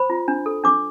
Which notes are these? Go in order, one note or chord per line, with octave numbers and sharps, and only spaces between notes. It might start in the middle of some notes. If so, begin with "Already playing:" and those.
Already playing: C5 B5
F4
D4
A4
D4 D6